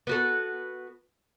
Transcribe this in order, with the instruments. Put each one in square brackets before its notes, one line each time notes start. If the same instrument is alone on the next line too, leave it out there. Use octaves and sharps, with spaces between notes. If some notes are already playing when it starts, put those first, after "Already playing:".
[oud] B3 F#4 A4